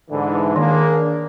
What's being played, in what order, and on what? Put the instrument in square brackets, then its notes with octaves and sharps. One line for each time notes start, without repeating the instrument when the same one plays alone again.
[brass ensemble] G#2 D3 E3
[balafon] D#3 [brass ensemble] A#3 D4 G#4